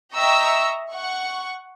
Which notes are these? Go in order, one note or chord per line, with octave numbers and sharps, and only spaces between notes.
D#5 E5 G5 A#5 C#6 E6
F#5 C#6